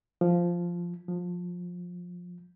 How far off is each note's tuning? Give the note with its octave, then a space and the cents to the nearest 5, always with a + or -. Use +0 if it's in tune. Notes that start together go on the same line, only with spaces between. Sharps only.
F3 -5
F3 +20